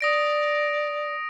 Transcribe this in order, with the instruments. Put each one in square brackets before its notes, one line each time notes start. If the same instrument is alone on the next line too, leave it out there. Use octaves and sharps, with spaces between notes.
[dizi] D5 [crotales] D#6 A#6 D7